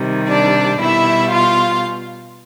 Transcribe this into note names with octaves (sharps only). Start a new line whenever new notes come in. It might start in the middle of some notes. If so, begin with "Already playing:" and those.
Already playing: C3 D#3 G3
D4 D5
B2 G3 E4 E5
F4 F5